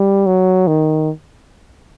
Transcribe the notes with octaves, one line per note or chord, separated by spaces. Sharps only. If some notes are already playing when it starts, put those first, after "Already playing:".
Already playing: G3
F#3
D#3